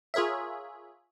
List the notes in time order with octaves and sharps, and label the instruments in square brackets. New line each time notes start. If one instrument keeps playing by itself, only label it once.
[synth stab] F4 G#4 A#4 C#5 E5